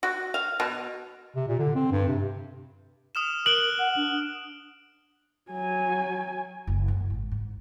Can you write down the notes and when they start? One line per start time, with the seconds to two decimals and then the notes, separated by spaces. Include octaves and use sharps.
0.03 F#4
0.34 F5
0.60 B2
1.36 C3
1.48 A#2
1.59 D3
1.75 C4
1.92 G2
2.08 C3
3.15 D#6 F6 E7
3.46 A#4 F#6 D7 F#7 G7
3.79 F#5
3.96 D4
5.51 F#3 G#5
6.67 F#1
6.88 F#2
7.10 G#1
7.31 G#2